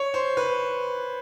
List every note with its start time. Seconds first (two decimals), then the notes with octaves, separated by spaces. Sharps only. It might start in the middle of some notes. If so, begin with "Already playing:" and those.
Already playing: C#5
0.14 C5
0.37 B4